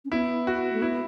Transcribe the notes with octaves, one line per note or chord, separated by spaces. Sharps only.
C#4
B3 E4
F#4
A3
B3 E4